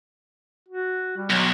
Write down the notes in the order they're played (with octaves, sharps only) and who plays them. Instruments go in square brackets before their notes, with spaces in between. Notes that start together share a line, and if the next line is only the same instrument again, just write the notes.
[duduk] F#4
G3
[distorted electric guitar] B1 [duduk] F#3